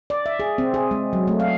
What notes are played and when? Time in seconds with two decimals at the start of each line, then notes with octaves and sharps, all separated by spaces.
0.10 D5
0.26 E5
0.40 G#4
0.58 C4
0.74 G#4
0.91 G#3
1.13 F#3
1.27 A3
1.40 F5